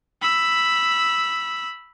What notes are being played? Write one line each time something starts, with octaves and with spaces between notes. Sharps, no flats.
B5 E6